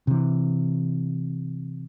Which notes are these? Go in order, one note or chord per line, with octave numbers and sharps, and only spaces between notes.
C3 E3